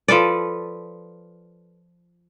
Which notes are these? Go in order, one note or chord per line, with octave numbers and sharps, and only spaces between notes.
F3 A4 B4 D5